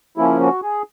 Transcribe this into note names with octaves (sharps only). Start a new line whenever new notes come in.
C#3 F3 A#3 C#4 E4
F#4
G#4